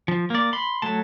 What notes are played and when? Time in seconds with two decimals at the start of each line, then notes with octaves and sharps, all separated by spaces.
0.08 F3
0.30 A#3 D5
0.53 B5 C6
0.82 F#3 A3 A5